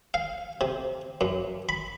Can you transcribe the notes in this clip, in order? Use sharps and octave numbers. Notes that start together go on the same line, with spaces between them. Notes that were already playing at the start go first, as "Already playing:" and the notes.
F5
C3
F#2
B5